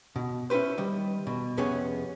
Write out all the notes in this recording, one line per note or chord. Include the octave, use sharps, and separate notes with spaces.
B2
C#4 E4 F4 B4 C5
D#3 G3
B2
F2 C3 B3 C#4 G#4 C#5